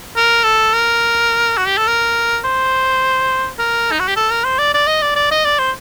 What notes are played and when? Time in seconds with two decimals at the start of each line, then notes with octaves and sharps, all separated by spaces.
0.16 A#4
0.44 A4
0.73 A#4
1.58 F#4
1.67 G4
1.78 A4
1.87 A#4
2.45 C5
3.59 A#4
3.91 D#4
4.00 F#4
4.08 G4
4.16 A4
4.30 A#4
4.44 C5
4.59 D5
4.74 D5
4.87 D#5
5.02 D5
5.16 D5
5.31 D#5
5.45 D5
5.59 C5